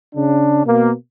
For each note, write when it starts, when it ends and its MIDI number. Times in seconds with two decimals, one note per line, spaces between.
0.16 0.62 49
0.16 0.62 62
0.66 0.92 47
0.66 0.92 58